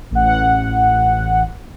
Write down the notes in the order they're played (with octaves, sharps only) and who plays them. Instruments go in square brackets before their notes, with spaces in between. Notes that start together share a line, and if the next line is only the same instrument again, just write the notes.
[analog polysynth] A1 F#5